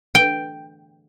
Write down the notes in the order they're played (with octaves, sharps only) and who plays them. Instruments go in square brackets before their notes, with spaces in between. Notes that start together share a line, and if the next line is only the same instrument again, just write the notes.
[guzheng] G5